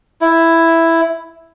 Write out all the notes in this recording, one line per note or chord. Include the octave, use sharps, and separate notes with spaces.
E4